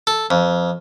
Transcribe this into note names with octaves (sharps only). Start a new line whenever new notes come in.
A4
F2